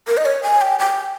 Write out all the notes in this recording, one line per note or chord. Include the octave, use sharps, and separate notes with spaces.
A#4
D#5
C#5
G#5
G5
G5